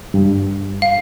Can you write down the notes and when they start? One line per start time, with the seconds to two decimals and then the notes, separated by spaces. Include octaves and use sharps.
0.14 G2
0.82 F5